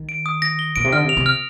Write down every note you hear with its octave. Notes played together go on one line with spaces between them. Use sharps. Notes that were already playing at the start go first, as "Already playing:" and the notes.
Already playing: D#3
D7
D#6
A#6
G7
A#2 D7
C3
D3 F6
C3
F7
C3
F6